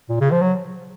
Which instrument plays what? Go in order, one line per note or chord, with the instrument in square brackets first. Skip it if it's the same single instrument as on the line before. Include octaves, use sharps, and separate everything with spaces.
[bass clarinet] A#2
C#3
F3
F#3